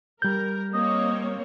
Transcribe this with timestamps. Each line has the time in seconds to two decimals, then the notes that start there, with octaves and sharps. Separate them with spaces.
0.22 G3 A#4 G6
0.74 A#3 C4 C#5 D#5